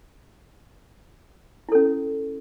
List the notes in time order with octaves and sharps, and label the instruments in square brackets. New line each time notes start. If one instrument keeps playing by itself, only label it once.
[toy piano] E4
A4
C#4